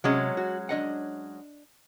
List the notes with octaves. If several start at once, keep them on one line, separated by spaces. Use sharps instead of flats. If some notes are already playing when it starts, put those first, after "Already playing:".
C3 F#3 G#3 C#4
F#4
D4 D#5 F#5